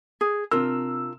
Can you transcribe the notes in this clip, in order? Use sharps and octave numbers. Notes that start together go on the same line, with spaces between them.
G#4
C3 D4 F4 A#4 E6